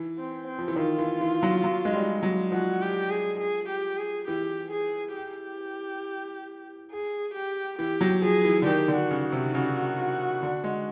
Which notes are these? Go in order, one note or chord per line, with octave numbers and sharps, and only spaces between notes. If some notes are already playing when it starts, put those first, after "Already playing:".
Already playing: E3
C4
C4
F3
E3
D#3 F4
E3
E3
F#3
F#3
G#3
G3
F#3
F3 F#4
G4
G#4
G#4
G4
G#4
E3 G4
G#4
G4
G#4
G4
E3 G4
F#3
F3 G#4
E3
D3
D#3 G4
D3
F#4
C#3
F#4
C3
C#3
D3
G#3